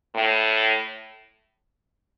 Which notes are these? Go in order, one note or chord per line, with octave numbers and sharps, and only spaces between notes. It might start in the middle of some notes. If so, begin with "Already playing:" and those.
A2